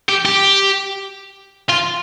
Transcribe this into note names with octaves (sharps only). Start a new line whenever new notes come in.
G4
G4
F4